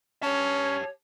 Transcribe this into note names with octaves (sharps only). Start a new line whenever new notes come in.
C#4 G4 C#5 A5